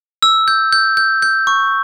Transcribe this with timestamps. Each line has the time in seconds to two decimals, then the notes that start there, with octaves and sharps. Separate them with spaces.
0.23 E6
0.48 G6
0.73 G6
0.97 G6
1.22 G6
1.47 C#6